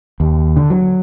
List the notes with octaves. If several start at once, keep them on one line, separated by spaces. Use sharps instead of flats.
D#2
D3
F#3